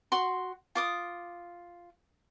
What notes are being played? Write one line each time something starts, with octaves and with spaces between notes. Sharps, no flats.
F#4 C6
F4 D6 D#6